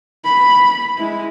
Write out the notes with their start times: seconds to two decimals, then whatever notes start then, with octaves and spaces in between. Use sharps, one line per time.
0.24 B5
0.97 G#3 E4